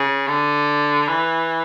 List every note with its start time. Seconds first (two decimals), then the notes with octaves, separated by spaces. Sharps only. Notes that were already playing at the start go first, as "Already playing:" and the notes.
Already playing: C#3
0.28 D3
1.08 E3